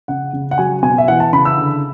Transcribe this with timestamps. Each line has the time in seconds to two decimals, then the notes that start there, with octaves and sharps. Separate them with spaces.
0.08 C#3 F#5
0.33 C#3
0.51 F#5
0.58 F#3 G#5
0.83 B2 G#5
0.98 E5
1.08 E3 F#5
1.20 A5
1.33 C#3 B5
1.45 E6
1.58 D3